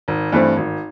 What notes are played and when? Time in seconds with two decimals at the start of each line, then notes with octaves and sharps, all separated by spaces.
0.08 G#1
0.32 G2 E3 A3 C4
0.56 G#1